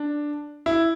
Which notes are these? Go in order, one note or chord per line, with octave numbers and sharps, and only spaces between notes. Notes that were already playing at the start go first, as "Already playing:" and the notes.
Already playing: D4
E4